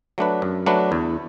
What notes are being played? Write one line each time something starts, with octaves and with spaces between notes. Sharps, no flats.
F#3 A3 D4 B4
F#2
F#3 A3 D4 B4
E2